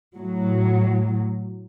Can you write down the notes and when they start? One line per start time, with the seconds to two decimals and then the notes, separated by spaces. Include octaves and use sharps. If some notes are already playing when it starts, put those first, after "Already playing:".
0.16 A2 F#3